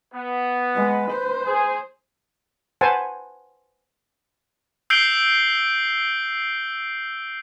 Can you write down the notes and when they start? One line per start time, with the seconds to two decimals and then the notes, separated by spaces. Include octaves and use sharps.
0.15 B3
0.75 G#3 B4
1.11 C5
1.46 G#4
2.81 B4 C5 F#5 G#5 A5
4.90 E6 G6 C7 D7 G7